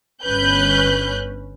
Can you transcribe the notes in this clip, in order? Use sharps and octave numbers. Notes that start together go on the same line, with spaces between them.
G1 C#4 B4 F#6 G6